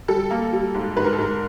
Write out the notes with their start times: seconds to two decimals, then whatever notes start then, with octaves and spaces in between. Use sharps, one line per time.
0.08 G3 A4
0.31 A#3
0.53 G3
0.75 G#2
0.97 G#2 B4
1.04 A#4
1.13 A4
1.19 G#2 A#4